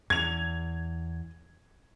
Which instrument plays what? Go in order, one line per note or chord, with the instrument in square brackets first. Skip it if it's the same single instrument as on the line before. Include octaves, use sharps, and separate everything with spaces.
[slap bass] E2 [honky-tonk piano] G#6 F7